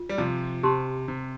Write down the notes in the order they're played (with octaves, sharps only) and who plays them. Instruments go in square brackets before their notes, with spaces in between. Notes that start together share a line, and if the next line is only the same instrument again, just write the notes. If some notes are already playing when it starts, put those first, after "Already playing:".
Already playing: [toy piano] F4
[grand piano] G3
C3 F3
[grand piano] C3 [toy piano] G4 C5 A5 C6
[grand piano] C3